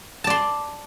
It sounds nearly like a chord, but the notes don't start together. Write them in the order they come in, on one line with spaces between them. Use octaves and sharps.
A5 D5 C6